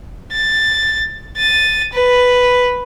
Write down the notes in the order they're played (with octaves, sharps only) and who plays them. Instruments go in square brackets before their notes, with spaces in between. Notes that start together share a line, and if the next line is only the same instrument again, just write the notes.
[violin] A6
A6 D#7
B4